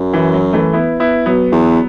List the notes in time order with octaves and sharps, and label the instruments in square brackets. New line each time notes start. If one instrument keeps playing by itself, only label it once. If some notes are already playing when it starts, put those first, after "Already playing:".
Already playing: [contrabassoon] F#2
[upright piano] E3
F#3
E3 A3
B3 E4
B3 E4
F#3 B3
[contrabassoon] E2